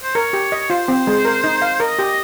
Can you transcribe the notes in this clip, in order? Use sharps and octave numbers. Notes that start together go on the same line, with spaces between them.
C5
A#4 C#5
G4
D#5
F4 C5
C4
G#3
A#4
D#4
F5
A#4 D#5
G4